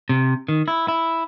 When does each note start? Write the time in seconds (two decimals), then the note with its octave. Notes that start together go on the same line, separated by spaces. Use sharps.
0.09 C3
0.49 D#3
0.68 E4
0.88 E4